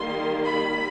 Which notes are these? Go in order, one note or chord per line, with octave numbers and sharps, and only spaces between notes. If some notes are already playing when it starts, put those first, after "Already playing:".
Already playing: D#3 G3 A#3 C6
B5